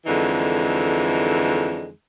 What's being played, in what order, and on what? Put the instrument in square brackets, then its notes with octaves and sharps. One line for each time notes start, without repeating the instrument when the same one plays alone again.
[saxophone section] F2 D3 E3 G#3 D#4